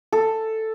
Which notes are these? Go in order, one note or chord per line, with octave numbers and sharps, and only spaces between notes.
A4